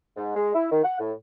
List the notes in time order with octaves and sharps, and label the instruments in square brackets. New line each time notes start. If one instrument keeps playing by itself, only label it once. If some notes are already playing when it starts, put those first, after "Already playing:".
[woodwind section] G#2
G#3
E4
D#3
F#5
A2